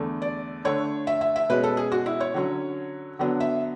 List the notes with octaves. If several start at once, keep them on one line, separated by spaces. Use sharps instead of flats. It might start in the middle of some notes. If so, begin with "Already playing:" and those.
Already playing: E2 D3 A3
D5
D3 A3 D4 C#5
E5
E5
E5
B2 G#3 C#4 B4
A4
G#4
F#4
E4
C#5
D3 F#3 C#4
D3 F#3 B3 D4
E5